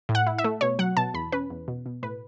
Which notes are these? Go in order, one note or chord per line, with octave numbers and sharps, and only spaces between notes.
A2
F#5
E4
E5
A3
B2 C#5
F#3 F#5
B2 A5
E2 B5
C#4 B4
E2
B2
B2
A2 B4